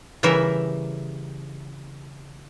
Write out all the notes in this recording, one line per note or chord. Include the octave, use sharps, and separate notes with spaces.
C#3 E3 G3 A#4 E5